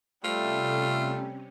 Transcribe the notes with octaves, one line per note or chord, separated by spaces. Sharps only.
C3 G3 A3 C#4 F4